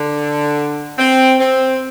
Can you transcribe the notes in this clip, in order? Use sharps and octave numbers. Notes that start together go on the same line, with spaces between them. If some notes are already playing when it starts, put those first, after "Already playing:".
Already playing: D3
C4
C4